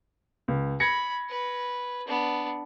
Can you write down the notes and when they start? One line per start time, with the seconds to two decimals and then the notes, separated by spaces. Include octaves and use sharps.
0.48 C#2
0.80 B5 G#6 A#6 C#7
1.29 B4
2.08 B3 D4